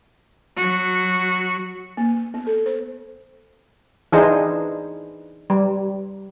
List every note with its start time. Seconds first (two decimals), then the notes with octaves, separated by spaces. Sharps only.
0.56 F#3 F#4
1.97 A#3
2.34 B3
2.47 A4
2.66 C5
4.12 E3 D4 D#4 G#4 C5
5.50 G3